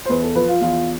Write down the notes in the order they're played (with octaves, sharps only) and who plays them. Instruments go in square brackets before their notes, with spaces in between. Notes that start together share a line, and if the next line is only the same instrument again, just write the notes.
[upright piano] C5
E2 B4
A4
F3 B4
F4
E2 F4